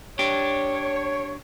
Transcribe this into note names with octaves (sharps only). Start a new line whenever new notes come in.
D4 G4 C#5